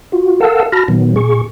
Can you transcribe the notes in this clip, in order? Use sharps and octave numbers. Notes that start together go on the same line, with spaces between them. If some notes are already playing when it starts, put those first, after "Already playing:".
F4 F#4
A4 A#4 F5 F#5 A5 E6
F#4 A5 B5 F6 A#6
A#2 D#3 F#3 B3
A#2 G#4 C#6